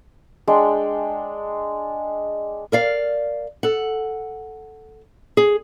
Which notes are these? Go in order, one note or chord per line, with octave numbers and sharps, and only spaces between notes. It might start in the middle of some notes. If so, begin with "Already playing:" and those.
G#3 D4 G5
A#4 D5 F5
A4 F#5
G#4